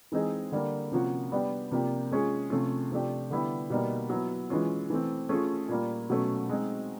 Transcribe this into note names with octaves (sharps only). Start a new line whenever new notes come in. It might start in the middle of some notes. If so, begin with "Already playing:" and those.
E3 G#3 C4 D#4 G#4
D3 G3 A#3
C3 F3 A#3 C#4 F#4
G3 B3 D4 G4
C3 F3 A#3 D4 G4
G#3 C#4 F4 G#4
C3 F3 A3 C#4 F4
C3 F3 A3 D4 G4
D3 G3 B3 E4 G4
B2 G3 A#3 D#4
F#3 B3 E4
E3 G#3 C#4 F4
E3 A3 C4
A3 C#4 F4 G#4
A#2 G3 A#3
B2 F#3 A3 C#4
G#3 C4 D#4